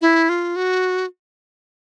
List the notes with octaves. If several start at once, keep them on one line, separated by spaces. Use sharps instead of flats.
E4
F4
F#4